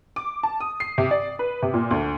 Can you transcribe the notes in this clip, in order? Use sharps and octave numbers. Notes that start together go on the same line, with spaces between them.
D6
A5
D#6
C7
C3
D5
B4
C3
A#2
D2